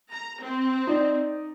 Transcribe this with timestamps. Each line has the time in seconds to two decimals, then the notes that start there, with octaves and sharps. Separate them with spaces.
0.12 A#5
0.41 C4
0.87 D#4 D5